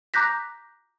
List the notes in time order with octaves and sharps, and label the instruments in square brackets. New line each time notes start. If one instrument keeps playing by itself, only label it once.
[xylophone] A#5 D6 F#6 G6 A#6 B6